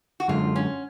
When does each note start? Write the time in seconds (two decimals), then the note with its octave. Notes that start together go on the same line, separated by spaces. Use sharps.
0.20 F#4
0.28 F#2 D3 G#3 F4
0.56 C#4